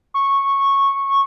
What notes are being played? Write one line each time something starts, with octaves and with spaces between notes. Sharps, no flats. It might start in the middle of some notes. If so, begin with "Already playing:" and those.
C#6